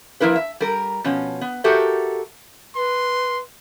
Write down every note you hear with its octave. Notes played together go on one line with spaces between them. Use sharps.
F3 A#3 E4 A#4 B4
E5
G3 A#4
B2 F3 C#4
B3
F#4 G4 A4 A#4 E5
B4 C6